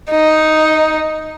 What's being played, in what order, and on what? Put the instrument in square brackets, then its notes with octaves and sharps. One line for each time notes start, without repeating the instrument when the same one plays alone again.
[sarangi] D#4